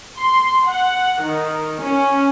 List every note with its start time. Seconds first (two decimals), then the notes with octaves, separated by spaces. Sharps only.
0.18 C6
0.67 F#5
1.22 D#3
1.83 C#4